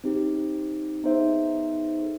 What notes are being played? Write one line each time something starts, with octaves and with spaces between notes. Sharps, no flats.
C4 D#4 G4
B3 D#4 G#4 C5 E5
A4